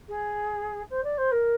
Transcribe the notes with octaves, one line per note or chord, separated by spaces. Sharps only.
G#4
C5
D5
C5
A#4